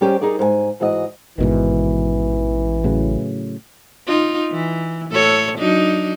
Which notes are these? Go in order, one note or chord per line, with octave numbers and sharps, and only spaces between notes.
G3 C#4 G4 A#4 C5 D5
D#4 G#4 A#4 D5
G#2 A#4 G#5
G#2 E3 F#4 D#5
A1 G#2 B2 D#3 E3
A2 C#3 F#3
D#4 F4
E3
A2 A4 C#5
F#3 D4 D#4